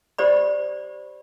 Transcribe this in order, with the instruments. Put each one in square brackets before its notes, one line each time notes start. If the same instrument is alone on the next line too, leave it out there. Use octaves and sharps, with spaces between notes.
[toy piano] G4 C5 D5 B5